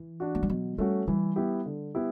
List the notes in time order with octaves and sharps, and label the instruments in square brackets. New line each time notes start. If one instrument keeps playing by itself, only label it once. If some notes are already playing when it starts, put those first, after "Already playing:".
Already playing: [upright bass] E3
[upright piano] D4 F#4
[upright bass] A3
G3
[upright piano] B2 [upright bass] F#3
[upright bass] G3 [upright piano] A3 C#4 F#4
[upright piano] E3 [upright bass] G3
[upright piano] B3 E4 G4
D3
B3 E4 G4